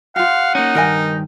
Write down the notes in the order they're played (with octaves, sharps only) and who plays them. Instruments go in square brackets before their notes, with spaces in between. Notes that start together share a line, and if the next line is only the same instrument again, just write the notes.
[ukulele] F4 G4 [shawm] F5 [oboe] F#5
[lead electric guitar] A#3 C#4 [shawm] D#4
[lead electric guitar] G2 D#3 [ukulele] A#4 D#5 G#5